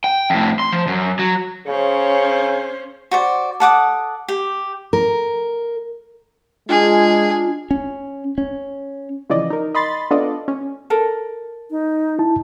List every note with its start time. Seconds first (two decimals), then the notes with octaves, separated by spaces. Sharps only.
0.04 G5
0.30 F2 A2
0.60 C6
0.73 F3
0.87 F#2
1.19 F#3
1.67 C#3 C#4 C5
3.11 F#4 C5 D5
3.60 A4 F#5 D6 D#6
4.29 G4
4.93 A#4
6.69 G#3 D4 F4 G#4
7.71 C#4
8.38 C#4
9.30 C#3 E3 F3 D5 D#5
9.50 D#4 A#4
9.75 D#5 B5 C6 A6
10.11 B3 D4 F4 A4 D5 D#5
10.48 C#4
10.90 A4 A#4
11.71 D#4
12.19 E4 A5